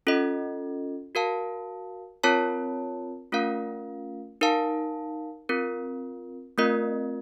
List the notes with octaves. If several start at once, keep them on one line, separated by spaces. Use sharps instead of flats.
C#4 F4 A4 D#5
F#4 A#4 F5 A5
C4 F4 A#4 C#5 A5
A3 C#4 F4 A#4 F5
D#4 A#4 F5 A5
C4 F4 A#4
A3 C4 F4 A#4 D#5